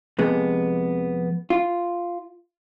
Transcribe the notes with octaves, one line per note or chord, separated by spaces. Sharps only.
F2 C3 G#3 B3
F4